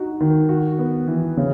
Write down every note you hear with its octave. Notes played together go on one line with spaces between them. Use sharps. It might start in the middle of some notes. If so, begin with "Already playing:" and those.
Already playing: D#4 F#4
D#3
F#4
B3
E3
C#3